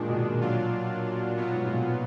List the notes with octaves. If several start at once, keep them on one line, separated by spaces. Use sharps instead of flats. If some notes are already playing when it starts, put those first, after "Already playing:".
Already playing: A#2 D#3 G#3 D4
B2
B2
A#2 F#3 D4 F4
B2 F#3 B3 F4
G#2
G#2
A#2